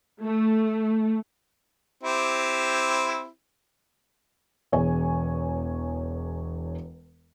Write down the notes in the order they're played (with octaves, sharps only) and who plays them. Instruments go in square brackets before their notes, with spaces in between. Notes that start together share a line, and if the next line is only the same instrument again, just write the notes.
[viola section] A3
[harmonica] C4 E4 G4
[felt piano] E1 E2 G#4 C#5 G#5